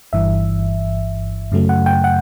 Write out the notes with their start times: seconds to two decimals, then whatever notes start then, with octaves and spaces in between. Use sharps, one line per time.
0.13 G1 G2 E3 E5
1.52 F#2 C#3 F#3 A3
1.69 F#5
1.86 G5
2.04 F#5